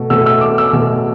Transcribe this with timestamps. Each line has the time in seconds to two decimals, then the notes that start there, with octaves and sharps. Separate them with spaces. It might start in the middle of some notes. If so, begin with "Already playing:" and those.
Already playing: B2 A3
0.10 B2 A3 E6
0.26 E6
0.41 D6
0.58 E6
0.73 B2 A3